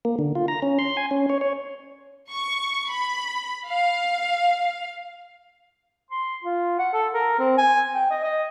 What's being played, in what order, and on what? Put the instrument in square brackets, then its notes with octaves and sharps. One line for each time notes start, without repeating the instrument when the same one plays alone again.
[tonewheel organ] A#3
D3
F4
A#5
C#4
C6
G#5
C#4
C#5
C#5
[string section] C#6
B5
F5
[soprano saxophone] C6
F4
F#5
A4
A#4
C4
G#5
G5
D#5
D#5